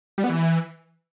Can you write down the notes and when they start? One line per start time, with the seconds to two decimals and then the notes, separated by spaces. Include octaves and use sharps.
0.18 G3
0.24 B3
0.30 E3